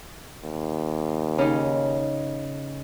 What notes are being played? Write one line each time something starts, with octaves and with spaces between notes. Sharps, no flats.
D#2
C#3 D#4